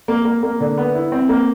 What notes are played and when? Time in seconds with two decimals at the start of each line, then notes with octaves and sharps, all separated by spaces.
0.08 A#3
0.25 A#3
0.43 A#3
0.60 D3
0.77 B3
0.94 E4
1.12 C4
1.29 A#3